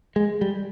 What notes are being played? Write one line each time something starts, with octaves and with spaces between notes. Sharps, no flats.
G#3
G3